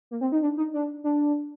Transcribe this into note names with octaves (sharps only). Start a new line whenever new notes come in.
A#3
C4
D#4
D4
D#4
D4
D4